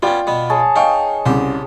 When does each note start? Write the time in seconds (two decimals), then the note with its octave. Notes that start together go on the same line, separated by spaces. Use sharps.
0.03 B3 C#4 F4 D5 G5
0.27 B2 B3
0.50 G#4 C#5 A5
0.76 D#4 F5 G5 C#6
1.26 C2 C#3 G4 C5